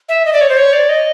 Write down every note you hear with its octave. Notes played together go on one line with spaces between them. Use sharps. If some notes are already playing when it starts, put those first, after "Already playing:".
E5
D#5
D5
C#5
C5
C#5
D5
D#5